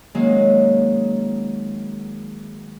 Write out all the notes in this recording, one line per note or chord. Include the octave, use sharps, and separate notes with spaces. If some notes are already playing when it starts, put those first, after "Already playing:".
D#3 F#3 G#3 A#3 C#4 D#4